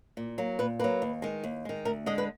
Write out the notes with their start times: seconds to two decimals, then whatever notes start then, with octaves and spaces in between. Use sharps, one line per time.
0.17 A#2
0.38 F#3 A#3
0.59 A#2 B4
0.79 F#3 A#3 B4
1.02 D#2
1.22 D#3 G#3
1.44 D#2
1.65 D#3 G#3
1.85 D2 A#4
2.06 D3 G#3 D#5
2.18 B4